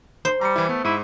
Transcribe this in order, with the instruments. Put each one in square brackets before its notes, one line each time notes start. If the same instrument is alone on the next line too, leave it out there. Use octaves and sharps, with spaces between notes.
[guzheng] C5
[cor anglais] G3 [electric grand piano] A#5 C6 C#7
[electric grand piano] E3 E4
[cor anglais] A3 [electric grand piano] B3
[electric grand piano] G#2 C#6 D#7 [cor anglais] E4